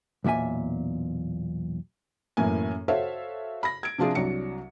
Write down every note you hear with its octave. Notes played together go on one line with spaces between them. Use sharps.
B1 E2 A#2 E5 G#5
F#2 A2 E3 A#3 G#5
F#4 A4 C5 C#5 E5 F5
B5 A#6
G#6 D7
C3 F3 D4 F4 G#4
C2 F#3 D4 C#7